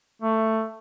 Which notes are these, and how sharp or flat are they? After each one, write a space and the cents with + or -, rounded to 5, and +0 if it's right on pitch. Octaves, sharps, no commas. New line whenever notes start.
A3 +10